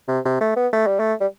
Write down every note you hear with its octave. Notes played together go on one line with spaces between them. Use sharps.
C3
C3
A3
B3
A3
G3
A3
G3